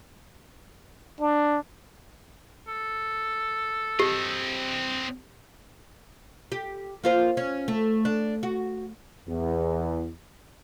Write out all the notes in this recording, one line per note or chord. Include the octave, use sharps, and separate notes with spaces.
D4
A4
C4 G4 D#5
G4
A#3 F4 C5
C#4
A3
D4
F#4
E2